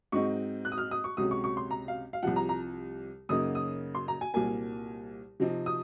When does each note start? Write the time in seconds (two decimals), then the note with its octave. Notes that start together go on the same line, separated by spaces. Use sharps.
0.12 G#2 F#3 C4 D#4 C#6
0.65 F#6
0.72 D#6
0.78 F6
0.91 D#6
1.04 C#6
1.17 C#2 C3 F#3 C#4 D#6
1.31 C#6
1.44 C#6
1.57 C6
1.71 A#5
1.88 F5
2.13 F5
2.23 C2 C3 F3 F#5
2.36 A#5
2.49 A#5
3.29 F#2 C#3 F#3 A#3 D#4 D#6
3.55 D#6
3.95 C6
4.08 A#5
4.21 G#5
4.34 C2 A#2 F#3 A#3 G#5
5.40 C3 F3 C4 D#4
5.66 D#6